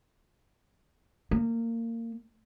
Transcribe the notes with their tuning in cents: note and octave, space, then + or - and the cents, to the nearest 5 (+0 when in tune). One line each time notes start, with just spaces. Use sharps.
A#3 -25